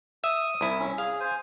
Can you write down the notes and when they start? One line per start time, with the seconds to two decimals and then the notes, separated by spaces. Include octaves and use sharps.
0.24 E5 D#6
0.61 C2 E4
0.79 C#4
0.98 G#4 F5
1.20 C5 G#5